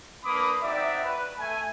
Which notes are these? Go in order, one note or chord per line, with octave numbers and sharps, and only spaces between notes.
A#3 D4 B4 B5 D6 D#6
C4 D#4 F#4 D5 E5
B4
A3 G#5